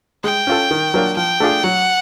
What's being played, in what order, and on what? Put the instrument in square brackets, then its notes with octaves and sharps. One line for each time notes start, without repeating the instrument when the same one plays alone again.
[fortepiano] G#3 [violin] G5
[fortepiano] C#4 F4 A4
D#3
F#3 A#3 D4 F4
[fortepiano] F3 [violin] G5
[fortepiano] A3 D4 F4 G#4
[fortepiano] F#3 [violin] F#5